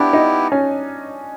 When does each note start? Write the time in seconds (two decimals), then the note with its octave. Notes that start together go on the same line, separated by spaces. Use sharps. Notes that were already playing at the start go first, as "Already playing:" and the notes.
Already playing: B3 D4 E4 G4
0.13 D#4
0.52 C#4